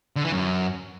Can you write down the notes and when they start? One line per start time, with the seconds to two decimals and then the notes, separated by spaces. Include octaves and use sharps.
0.16 D3
0.24 E3
0.32 F#2